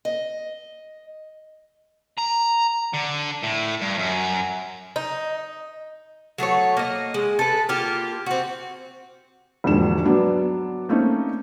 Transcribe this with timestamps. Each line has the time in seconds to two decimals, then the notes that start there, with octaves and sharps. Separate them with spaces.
0.05 D#5
2.18 A#5
2.94 D3
3.43 A2
3.81 G2
3.98 F#2
4.96 D#4
6.38 F#3 A3 B3 C#5
6.77 A#3 D#5
7.14 G#3
7.39 A4 B4
7.69 A#3 F4 G4
8.26 C4 F#4
9.64 E1 A#1 G#2 D3 E7
10.05 F#3 B3 D4
10.89 A3 A#3 C4 C#4 D#4